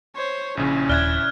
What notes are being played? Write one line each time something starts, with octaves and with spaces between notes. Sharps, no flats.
C5 C#5
A#1 C#3 C#4 E4
D#1 D5 E5 F6 F#6 G#6